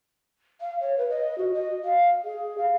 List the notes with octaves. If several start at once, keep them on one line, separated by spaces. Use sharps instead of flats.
F5
C#5
B4
D#5
F#4
D#5
F5
G#4
F5